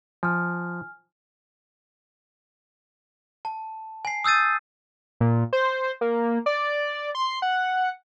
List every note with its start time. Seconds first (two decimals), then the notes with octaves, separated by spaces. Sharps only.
0.23 F3 G#5 F6
3.45 A5
4.05 G#5 C7
4.24 D#6 E6 G6 A6 D#7
5.21 A#2
5.53 C5
6.01 A#3
6.46 D5
7.15 C6
7.42 F#5